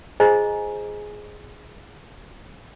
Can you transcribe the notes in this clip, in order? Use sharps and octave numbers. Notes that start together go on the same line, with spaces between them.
F4 G#4 C5 D#5 G#5 A#5